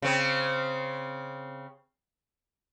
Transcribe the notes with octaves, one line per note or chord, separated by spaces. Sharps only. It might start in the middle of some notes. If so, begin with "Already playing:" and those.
C#3 C4